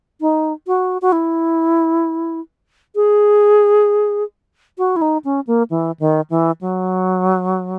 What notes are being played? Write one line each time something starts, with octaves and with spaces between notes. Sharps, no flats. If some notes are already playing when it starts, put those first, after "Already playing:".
D#4
F#4
F#4
E4
G#4
F#4
E4
D#4
C#4
A#3
E3
D#3
E3
F#3